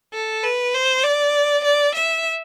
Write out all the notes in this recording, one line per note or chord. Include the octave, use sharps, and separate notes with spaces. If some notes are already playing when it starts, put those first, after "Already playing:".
A4
B4
C5
D5
D5
E5